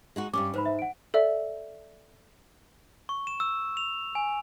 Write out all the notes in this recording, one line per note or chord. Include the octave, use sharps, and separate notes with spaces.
G#3 D#4 F#4
G2 G3 C#4 D6
G#2 B4 C5 B5
E5
F#5 D7
A4 D5 E5
C#6
E7
E6
F7
G#5